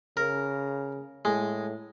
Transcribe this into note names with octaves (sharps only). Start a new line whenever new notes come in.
C#3 A#4
A2 G#3